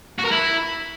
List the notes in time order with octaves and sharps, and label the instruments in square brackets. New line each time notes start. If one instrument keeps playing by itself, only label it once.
[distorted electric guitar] F#4
A#4
E4